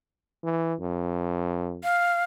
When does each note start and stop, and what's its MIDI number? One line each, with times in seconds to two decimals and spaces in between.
0.44 0.74 52
0.80 1.81 41
1.84 2.24 77